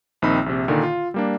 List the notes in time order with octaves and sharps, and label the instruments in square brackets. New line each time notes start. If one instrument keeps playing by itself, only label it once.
[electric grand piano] A#1 D#3 C4 D#4 B5 E6
A#1 C3
A#2 D3 D#3
F4
G3 A#3 D4